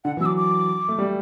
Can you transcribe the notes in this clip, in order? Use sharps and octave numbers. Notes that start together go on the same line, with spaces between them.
D3 F#5
E3
F#3 E6
D6
D6
A3
G3